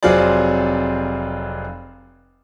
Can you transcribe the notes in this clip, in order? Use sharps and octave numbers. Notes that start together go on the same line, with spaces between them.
F1 F#3 C4 F4 G#4 D5